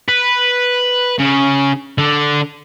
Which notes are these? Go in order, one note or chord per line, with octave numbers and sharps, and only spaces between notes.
B4
C#3
D3